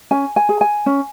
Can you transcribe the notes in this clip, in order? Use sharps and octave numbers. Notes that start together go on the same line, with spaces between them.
C#4 G#5
G#5
G#4
G#5
C#4